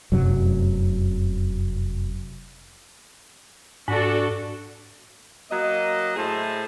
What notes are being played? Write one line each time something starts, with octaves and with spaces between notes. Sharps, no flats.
F1 F#2 C3 F#3
G#2 D4 F#4 A4
F#3 A#3 D#5
A2 E4 G#4 C5 A5